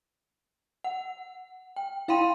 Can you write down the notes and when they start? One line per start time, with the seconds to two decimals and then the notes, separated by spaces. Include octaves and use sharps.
0.84 F#5
1.76 G5
2.08 E4 F5 G5 B5 C6 D#7